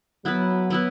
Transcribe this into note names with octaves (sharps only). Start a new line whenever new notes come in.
F#3 B3 E4 B4
B3 E4 B4